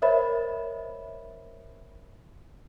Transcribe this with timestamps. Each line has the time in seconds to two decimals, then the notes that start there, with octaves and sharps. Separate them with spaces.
0.02 A#4 C5 C#5 D#5 E5 B5